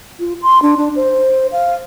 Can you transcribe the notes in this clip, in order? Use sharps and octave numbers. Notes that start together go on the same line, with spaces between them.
F4
C6
D4
D4
C5
F5